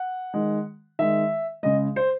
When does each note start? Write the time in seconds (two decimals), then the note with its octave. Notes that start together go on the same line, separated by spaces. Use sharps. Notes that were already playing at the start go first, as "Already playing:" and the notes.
Already playing: F#5
0.34 D#3 G#3
0.99 D#3 G#3 E5
1.63 C#3 G#3 D#5
1.96 C5